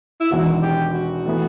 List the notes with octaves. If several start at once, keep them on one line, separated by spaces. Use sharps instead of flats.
E4
E1 E2 D#3 F#4
G4
F#4
A2 E3 B3